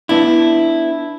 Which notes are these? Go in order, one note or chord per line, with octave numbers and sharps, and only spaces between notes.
B3 D4 E4